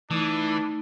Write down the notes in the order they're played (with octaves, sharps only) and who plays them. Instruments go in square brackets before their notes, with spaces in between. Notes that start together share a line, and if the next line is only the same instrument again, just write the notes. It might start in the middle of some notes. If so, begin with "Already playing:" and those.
[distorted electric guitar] E3 [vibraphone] A3 D#4 [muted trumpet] D4